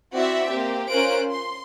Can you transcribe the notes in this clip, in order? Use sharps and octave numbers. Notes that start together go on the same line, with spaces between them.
C4 E4 F#4 D5 E5
A#3 C4 G4
C#4 F4 A#4 C5 F#6 D7
C6